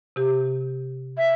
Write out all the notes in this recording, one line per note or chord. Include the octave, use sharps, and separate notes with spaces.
C3 G4
E5